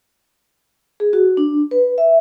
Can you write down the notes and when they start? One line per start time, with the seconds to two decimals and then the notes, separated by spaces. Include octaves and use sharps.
1.00 G#4
1.13 F#4
1.37 D4
1.71 B4
1.98 E5